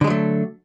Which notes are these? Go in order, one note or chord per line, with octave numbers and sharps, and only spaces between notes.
D3 F#3 G#3 A3